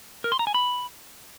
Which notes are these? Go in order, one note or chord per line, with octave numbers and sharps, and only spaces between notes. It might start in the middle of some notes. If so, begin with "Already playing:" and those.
A#4
C6
A#5
G#5
B5